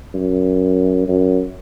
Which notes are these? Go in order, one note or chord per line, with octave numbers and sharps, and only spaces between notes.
F#2
F#2